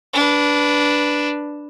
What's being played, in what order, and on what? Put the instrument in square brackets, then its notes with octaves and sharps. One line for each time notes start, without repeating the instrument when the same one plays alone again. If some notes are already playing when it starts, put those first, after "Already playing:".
[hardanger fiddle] D4 B4